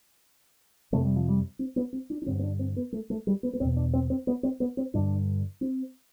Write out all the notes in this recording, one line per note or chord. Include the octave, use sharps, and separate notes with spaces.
F2 C3 A3
G3
F3
G3
C4
B3
C4
D4
D4
G2 D3 C4
C4
D4
C4
B3
A3
A3
G3
B3
B3
E2 B2 C4
D4
C4
C4
B3
C4
B3
C4
G2 D3 D4
C4